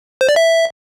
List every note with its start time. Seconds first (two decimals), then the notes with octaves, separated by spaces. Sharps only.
0.21 C5
0.29 D5
0.36 E5